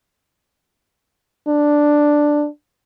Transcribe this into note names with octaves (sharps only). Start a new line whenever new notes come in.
D4